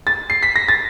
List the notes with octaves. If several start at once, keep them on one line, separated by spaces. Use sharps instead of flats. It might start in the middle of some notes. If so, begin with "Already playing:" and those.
A6
C7
B6
A#6
A6